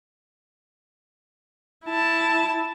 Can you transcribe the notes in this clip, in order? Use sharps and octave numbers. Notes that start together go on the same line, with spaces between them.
E4 A5